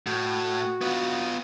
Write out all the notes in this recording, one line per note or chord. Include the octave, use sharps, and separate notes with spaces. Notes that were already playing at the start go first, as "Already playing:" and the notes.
A2 F#4
B3 F4